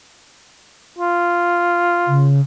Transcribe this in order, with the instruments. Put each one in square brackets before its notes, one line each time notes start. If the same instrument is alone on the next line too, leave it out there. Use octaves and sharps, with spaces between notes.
[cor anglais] F4
[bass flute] C#3